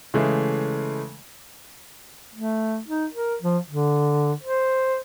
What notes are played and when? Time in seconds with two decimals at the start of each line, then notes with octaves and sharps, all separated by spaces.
0.14 C#3 E3 G#3 A3
2.35 A3
2.88 D#4
3.13 A#4
3.41 F3
3.68 D3
4.43 C5